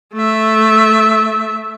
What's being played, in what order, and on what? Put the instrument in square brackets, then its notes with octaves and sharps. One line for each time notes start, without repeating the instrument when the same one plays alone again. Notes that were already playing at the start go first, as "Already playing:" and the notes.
[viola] A3 E5